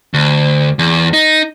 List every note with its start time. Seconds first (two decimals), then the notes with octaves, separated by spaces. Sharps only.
0.14 D2
0.79 E2
1.13 D#4